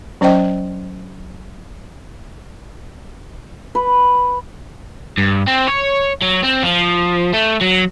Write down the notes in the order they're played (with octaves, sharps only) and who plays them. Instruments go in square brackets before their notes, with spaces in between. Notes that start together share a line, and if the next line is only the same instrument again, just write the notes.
[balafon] F#3 C#4 C5 D#5 G5
[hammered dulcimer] B4
[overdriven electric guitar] G2
C4
C#5
F#3
C4
F3
A3
F#3